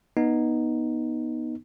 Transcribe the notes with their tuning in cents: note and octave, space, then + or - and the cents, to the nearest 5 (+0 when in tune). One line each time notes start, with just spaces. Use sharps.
B3 -20 D#4 -5